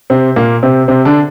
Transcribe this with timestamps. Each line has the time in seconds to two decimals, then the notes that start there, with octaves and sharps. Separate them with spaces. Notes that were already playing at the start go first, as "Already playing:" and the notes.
0.10 C3 C4
0.36 A#2 A#3
0.63 C3 C4
0.88 C3 C4
1.05 D3 D4